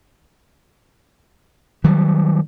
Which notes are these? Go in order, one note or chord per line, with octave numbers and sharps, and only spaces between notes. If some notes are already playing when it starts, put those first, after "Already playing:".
D#3 F#3 G3